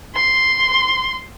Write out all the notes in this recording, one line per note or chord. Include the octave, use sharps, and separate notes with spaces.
C6